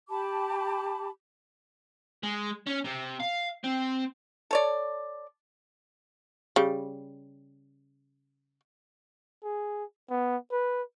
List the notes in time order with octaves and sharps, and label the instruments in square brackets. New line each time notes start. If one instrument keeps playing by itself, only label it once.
[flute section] G4 A5 B5 D6
[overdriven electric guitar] G#3
C#4
C3
F5
C4
[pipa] A4 C#5 D5
[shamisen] C#3 G3
[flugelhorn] G#4
B3
B4